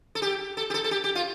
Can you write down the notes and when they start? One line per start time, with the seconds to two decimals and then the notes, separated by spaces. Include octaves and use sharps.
0.15 A4
0.22 G4
0.57 A4
0.70 G4
0.74 A4
0.84 A4
0.91 G4
1.04 G4
1.15 F4